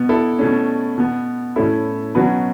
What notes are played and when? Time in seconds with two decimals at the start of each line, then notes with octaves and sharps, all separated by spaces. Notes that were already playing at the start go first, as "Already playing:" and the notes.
Already playing: B2 B3
0.09 E4 A4
0.39 B2 A3 C#4
0.98 B2 B3
1.56 A2 A3 C#4 E4 A4
2.15 B2 F#3 C#4 F#4 B4